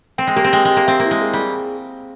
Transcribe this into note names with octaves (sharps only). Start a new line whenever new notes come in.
C4 G5
G#3
A#3 G4
C4
G#3 G5
G#3
G4
A#3
C4 E5
A#3
E4
G#3
G#4
G3
G#4